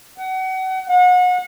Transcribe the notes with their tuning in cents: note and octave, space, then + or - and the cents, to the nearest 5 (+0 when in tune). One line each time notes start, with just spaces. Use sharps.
F#5 +30
F#5 -35